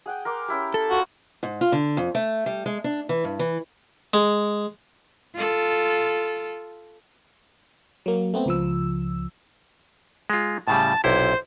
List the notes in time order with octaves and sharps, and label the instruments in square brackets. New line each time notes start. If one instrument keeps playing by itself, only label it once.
[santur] G#4 F#5 G5
A#4 C6 D6
C#4 E4 G4
[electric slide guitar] A4
[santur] F4 [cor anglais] F#4
[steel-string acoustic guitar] G#2
F4
D3
F2
A3
G3
G#3
D4
E3
G2
E3
[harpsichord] G#3
[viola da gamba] F4 A4
[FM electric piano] F#3 A#3
A3 B3 C4
C#2 F3 E6
[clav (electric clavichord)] G#3 F4
[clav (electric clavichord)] A2 C#3 G3 [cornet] A5
[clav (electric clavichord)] B1 C3 E4 [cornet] C5